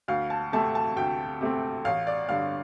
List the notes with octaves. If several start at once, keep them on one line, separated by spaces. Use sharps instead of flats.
D2 F5
A5
C3 A3 C4 A5
A5
D2 G5
C3 A3 C4
A1 F5
D5
G2 D3 F5